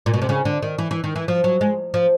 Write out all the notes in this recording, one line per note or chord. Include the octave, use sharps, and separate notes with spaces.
A#2
B2
C3
C#3
D3
D#3
E3
E3
D#3
E3
F3
F#3
G#3
F3